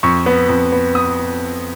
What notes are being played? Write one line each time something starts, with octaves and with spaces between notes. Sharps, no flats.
F2 C#6
B3
F2
B3
B3 D#6